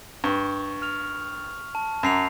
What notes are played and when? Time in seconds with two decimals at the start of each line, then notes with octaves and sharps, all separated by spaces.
0.24 G2 C#6
0.82 F6 F7
1.75 A5
2.03 F#2 A#5 C7 F7